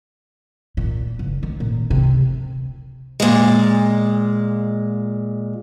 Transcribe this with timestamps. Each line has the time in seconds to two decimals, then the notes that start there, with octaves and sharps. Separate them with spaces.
0.77 A#2
1.19 F#1
1.43 D#3
1.60 A#2
1.90 C3
3.20 A#2 G#3